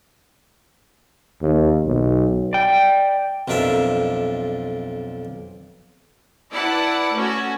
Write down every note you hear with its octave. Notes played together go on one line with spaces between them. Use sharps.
D#2
B1
D5 G5
B1 F2 D4 A#4 E5
E4 B4 D5 F#5 A5
A3 C#4 F#4